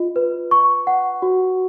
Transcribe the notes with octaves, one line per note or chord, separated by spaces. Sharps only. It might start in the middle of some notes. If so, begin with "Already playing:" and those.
Already playing: F4 D#5
B4
C#6
F#5
F#4